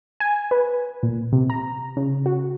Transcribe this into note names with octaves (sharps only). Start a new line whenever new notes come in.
G#5
B4
A#2
C3
A#5
C#3
F#4